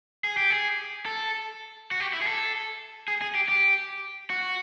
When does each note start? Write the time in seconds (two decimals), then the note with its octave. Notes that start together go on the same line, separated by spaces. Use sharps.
0.24 G#4
0.37 G4
0.50 G#4
1.06 A4
1.91 F#4
2.00 G4
2.13 E4
2.22 G#4
2.27 A4
3.08 G#4
3.22 G#4
3.35 G4
3.49 G4
4.30 F#4